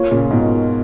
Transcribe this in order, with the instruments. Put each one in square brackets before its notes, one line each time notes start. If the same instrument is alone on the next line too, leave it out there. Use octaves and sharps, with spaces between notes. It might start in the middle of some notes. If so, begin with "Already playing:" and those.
Already playing: [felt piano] A#3 F4 A#4 C#5
[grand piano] A#2 C#3
G#2 B2